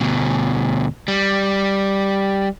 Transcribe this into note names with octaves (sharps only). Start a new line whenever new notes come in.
D2 B2
G3